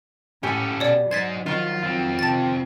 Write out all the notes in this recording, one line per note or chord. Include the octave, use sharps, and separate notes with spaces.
A2 C#4 G4 A4 G#5
B2 C#5 D5
F#3 D#4 C5 G#6 A6 B6
D#3 F3 F4
C4 F4
C3 A5 A6